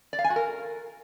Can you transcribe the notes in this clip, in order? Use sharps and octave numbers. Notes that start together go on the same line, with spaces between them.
D5
F5
G#5
F#4
A#4